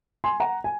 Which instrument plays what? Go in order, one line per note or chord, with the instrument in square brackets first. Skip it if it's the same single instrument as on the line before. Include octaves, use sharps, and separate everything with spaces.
[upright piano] G#5 C6
F#5 A#5
G#5